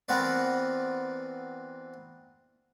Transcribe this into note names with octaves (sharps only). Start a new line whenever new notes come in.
E3 B3 C4 F#4 A#4 D5